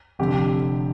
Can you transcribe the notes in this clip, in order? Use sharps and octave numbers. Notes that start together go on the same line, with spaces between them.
F1 F2 D3 G4